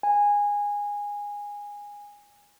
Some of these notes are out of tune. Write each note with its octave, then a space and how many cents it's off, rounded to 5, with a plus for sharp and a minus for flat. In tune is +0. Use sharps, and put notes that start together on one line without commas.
G#5 -15